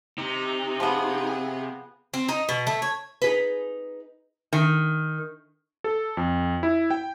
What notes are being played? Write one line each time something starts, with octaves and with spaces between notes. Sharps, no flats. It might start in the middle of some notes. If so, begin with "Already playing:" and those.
C3 D#4
F3 B3 G#4
C4
D#4
B2
A3
C#5
D#4 G#4 B4
D#3
A4
F2
E4
G5